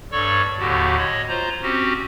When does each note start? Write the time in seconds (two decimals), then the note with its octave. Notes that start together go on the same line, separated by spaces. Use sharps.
0.12 G2 A4 C#5 D5 C#6 E6
0.59 D#2 A2 D3 F#4 G4
0.97 C#5 D#5 B5
1.29 F4 C5 A#5
1.62 C4 C#4 F#4 G4